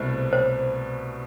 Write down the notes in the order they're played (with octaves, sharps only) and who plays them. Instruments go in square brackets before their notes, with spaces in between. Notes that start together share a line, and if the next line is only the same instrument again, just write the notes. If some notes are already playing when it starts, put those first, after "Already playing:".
Already playing: [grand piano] C2 B2 A3 E4 [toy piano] C5
[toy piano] C5